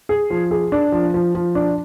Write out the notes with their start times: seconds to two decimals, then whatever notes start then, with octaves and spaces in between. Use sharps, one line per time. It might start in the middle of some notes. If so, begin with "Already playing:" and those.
0.09 G#4
0.30 F3
0.51 G#4
0.72 D4
0.92 F3
1.14 F3
1.35 F3
1.55 D4